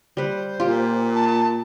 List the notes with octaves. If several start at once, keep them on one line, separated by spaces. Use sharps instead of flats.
G3 B4 C5
A#2 F4 G4
A5